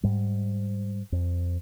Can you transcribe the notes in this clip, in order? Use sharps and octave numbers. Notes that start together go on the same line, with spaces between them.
G#2 G3
F2